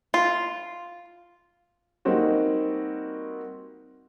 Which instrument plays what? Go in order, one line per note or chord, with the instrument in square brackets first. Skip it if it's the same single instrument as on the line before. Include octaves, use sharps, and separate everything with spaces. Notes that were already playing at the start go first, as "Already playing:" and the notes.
[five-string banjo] F4
[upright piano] G3 A#3 C4 D#4 F#4